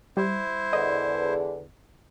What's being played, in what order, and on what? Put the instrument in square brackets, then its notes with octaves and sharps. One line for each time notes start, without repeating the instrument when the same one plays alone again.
[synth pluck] G3 [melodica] E4 C5
[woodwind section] E2 D3 [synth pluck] D#5